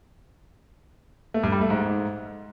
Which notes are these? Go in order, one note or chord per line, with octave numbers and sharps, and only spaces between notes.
A3
G2
G3
A3
G#2